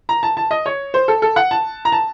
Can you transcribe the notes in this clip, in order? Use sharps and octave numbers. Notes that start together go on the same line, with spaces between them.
A#5
A5
A5
D#5
C#5
C5
A4
A4
F#5
A5
A#5
A5